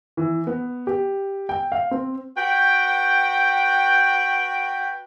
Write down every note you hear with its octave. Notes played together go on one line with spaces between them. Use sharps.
E3
B3
G4
G5
F5
C4
F#4 B4 G5